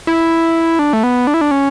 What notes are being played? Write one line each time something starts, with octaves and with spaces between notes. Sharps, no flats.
E4
D4
A3
B3
D4
E4
D4
C#4